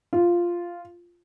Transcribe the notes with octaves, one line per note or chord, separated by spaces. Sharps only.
F4